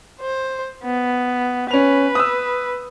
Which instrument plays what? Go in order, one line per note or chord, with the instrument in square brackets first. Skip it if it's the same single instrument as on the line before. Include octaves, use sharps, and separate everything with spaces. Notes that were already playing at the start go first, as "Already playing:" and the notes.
[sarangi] C5
B3
[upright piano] C#4 F7 [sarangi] B4
[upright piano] D#6 E6